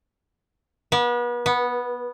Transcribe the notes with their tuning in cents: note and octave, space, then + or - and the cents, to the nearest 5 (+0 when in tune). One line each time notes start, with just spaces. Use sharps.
B3 -35
B3 -10